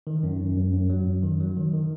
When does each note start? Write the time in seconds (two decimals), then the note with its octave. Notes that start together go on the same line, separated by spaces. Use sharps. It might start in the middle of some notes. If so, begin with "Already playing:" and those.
0.07 D#3
0.23 F#2
0.40 F#2
0.57 F#2
0.73 F#2
0.90 F#3
1.07 F#2
1.23 D#3
1.40 F#3
1.57 D#3
1.73 D#3